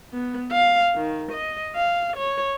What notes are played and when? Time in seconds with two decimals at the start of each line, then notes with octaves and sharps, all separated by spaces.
0.13 B3
0.52 F5
0.96 D#3
1.32 D#5
1.75 F5
2.17 C#5